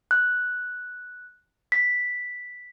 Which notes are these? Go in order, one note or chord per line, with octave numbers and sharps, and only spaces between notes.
F#6
B6